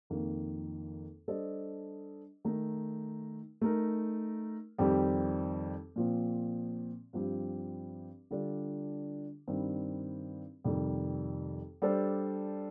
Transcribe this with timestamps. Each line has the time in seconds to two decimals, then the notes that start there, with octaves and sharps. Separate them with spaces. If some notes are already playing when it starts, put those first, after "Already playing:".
0.10 F2 D#3 A#3
1.28 G3 D4 A4 C5 D#5
2.45 D#3 A3 D#4 A#4
3.61 A3 D#4 A#4
4.78 F2 D#3 G3 C4 G4
5.96 A#2 F3 C4
7.13 G2 F3 C4 G4
8.31 D3 G3 D4 F4 A4
9.48 G2 D#3 G3 C4
10.64 F2 C3 D#3 G3
11.82 G3 D4 A4 C5